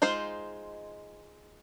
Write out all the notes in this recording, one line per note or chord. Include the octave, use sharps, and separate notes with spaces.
G#3 D#4 F4 C5